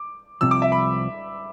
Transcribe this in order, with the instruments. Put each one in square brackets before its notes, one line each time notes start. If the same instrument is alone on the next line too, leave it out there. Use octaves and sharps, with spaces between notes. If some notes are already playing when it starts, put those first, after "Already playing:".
Already playing: [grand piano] D6
[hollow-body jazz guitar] C2 C3 F3 [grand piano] E6
[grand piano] D6
E5
B5